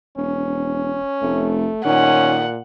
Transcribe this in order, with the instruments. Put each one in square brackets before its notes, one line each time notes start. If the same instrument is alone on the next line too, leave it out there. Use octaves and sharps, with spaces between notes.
[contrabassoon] E1 [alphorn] C#4
[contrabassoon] F1 [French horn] A3
[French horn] A#2 [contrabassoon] D#3 [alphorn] C#4 [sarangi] F#5